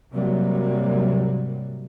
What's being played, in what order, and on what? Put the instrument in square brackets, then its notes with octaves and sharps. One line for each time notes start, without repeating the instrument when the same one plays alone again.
[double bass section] G#2 C3 F#3 G3 A#3